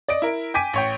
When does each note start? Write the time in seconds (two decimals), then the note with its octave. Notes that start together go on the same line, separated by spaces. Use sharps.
0.08 D5 D#5 D7
0.22 E4 A#4
0.54 G5 G#5 D6 B6 D#7
0.73 A1 C#5 G5